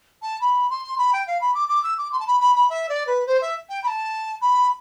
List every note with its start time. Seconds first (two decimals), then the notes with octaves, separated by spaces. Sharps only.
0.22 A5
0.41 B5
0.70 C6
0.98 B5
1.13 G5
1.27 F5
1.41 B5
1.55 D6
1.69 D6
1.84 E6
1.98 D6
2.12 C6
2.20 A5
2.27 B5
2.41 B5
2.56 B5
2.70 E5
2.89 D5
3.07 B4
3.27 C5
3.41 E5
3.69 G5
3.84 B5
3.87 A5
4.41 B5